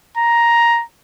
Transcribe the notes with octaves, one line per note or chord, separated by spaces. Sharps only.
A#5